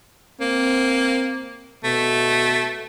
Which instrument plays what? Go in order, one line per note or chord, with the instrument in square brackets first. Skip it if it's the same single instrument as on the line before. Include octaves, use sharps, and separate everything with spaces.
[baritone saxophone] A#3 [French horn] C4
[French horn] B2 [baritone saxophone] A3